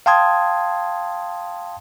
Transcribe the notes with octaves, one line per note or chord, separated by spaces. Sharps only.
F5 G5 A5 C6 D#6 G#6